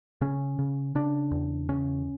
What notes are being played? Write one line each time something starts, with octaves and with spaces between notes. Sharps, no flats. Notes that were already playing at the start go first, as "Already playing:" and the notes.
C#3 C#4
C#3
C#3 D4
E2
C#3 C#4